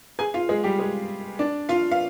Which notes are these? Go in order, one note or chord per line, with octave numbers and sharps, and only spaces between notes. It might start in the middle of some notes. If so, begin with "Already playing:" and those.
G#4 G#5
F4 F5
G#3 G#4
G3 G4
G#3 G#4
D4 D5
F4 F5
F5